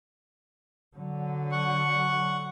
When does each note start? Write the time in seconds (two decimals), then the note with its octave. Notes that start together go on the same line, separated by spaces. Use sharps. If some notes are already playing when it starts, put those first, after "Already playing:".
0.96 D3 F#3
1.52 F#5 C#6